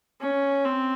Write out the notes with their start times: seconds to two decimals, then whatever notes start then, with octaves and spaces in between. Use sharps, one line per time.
0.21 C#4
0.65 C4